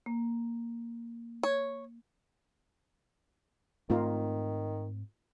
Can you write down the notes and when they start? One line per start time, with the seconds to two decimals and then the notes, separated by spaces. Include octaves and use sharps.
0.06 A#3
1.43 C#5
3.90 G#2 D#3 A3 C4 D#4 F4 A#4